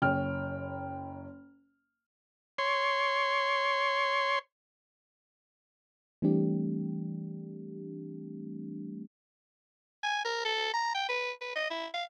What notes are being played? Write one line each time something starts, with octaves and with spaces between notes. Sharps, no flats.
F#1 C#4 G5 F6
C#5 C6
E3 G3 A3 C4 D4 G4
G#5
A#4
A4
A#5
G5
B4
B4
D#5
E4
F5